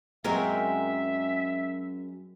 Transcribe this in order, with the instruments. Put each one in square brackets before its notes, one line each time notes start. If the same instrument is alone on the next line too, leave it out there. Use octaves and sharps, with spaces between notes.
[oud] F#2 [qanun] G#3 C4 A#4 [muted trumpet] E5